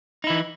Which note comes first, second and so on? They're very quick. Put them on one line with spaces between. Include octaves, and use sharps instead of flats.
D#4 E4 E3